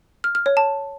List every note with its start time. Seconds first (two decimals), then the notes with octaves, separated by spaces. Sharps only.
0.24 F6
0.35 F6
0.46 C#5
0.57 A5